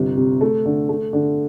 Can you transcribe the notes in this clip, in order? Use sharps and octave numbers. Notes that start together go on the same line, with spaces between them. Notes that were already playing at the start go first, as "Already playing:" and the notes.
Already playing: G1 C3
C3
A3
D3
A3
D3